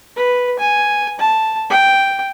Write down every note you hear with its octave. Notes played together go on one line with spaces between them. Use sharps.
B4
G#5
A5
G5